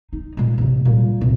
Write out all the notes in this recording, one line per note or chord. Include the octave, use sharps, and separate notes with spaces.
D#4
A#2 G#3
A1 C3
A#2 G3
C2